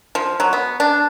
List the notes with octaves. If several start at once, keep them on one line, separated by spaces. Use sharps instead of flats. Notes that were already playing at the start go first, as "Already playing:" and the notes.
F3
F#3
B3
D4